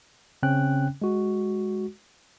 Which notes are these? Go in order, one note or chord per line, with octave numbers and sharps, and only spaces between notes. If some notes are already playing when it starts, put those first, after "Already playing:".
C#3 C4 C#4 G5 F#6
G#3 F#4